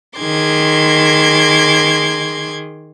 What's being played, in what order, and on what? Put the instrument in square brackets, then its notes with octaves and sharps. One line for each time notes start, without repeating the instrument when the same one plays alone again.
[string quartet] D#3 G#4 C6 D6 G#6